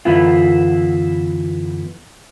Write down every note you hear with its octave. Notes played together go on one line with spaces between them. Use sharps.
F#2 D3 E3 B3 E4 F4